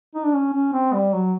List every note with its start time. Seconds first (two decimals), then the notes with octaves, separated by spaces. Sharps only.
0.15 D#4
0.24 D4
0.33 C#4
0.54 C#4
0.73 C4
0.93 G3
1.13 F#3